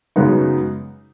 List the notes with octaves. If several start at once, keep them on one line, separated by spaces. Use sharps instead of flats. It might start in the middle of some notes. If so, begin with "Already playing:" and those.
F#2 C#3 G#3 B3 D#4